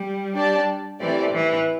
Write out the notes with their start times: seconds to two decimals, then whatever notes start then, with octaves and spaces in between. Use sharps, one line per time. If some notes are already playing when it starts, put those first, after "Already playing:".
Already playing: G3
0.35 D4 G4 D5 A5
0.99 E3 A3 C4 G4 D5
1.32 E3